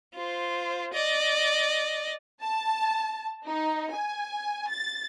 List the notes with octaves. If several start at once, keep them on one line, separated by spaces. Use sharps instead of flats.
F4 C5
D5 D#5
A5
D#4
G#5
A6